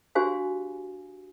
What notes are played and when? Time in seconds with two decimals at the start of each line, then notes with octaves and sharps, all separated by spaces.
0.15 D4 F#4 G4 C5 F5 G#5